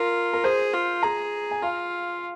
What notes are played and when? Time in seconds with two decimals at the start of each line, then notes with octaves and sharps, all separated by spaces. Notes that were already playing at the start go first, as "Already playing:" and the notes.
Already playing: F4 A#4
0.33 A#4
0.44 G#4 C5
0.73 F4
1.03 G#4 A#5
1.51 G#5
1.62 F4 F5